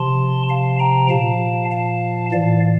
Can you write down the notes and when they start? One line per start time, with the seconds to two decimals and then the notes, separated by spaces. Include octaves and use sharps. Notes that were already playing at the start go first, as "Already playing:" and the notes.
Already playing: C3 F3 A5 C6
0.49 F5 A5
0.79 G5 A#5
1.10 A#2 F3 F5 A5
1.71 F5 A5
2.31 A2 E3 D5 F5